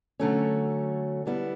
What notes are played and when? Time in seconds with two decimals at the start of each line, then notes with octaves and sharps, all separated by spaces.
0.20 D3 F#3 A3 C#4
1.26 D3 G3 B3 E4